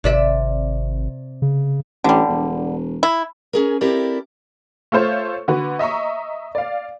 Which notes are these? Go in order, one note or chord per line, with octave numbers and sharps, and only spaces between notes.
G#1 C3 D5 E5
C#3
A1 D3 G3
E1
E4
C#4 G#4 A#4
C4 E4 G4 A4 A#4 D5
A3 F4 A4 C5 C#5
D3 F#4 B4
D#5 E5 A#5 C#6
D5 F5